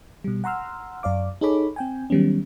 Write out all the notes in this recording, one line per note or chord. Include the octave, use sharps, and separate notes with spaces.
B2 G3
F#5 A#5 C6 E6 F6
F#2 D5 F5 D6
D#4 G#4 A4 C#5 B5 D6
C4 G5 G#5
D#3 F#3 G3 B3 C#4